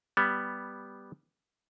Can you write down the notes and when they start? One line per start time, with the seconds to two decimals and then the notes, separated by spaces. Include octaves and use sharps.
0.17 G3 B3